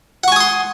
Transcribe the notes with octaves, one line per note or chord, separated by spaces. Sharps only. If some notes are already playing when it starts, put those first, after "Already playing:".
F#5 G#5 C6 C#6 D#6